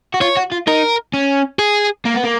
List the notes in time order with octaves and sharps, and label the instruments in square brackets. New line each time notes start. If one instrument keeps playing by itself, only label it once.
[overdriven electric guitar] F#4
[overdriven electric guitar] F4 [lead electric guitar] C#5
[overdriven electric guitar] F#4
F4
[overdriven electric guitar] D#4 [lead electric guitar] A#4
[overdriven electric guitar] C#4
[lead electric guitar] G#4
[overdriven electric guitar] A#3
B3
A#3